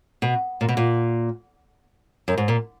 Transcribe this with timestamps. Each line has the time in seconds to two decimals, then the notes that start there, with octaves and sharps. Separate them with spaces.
0.22 B2
0.61 A#2
0.69 B2
0.77 A#2
2.28 F#2
2.38 G#2
2.48 A#2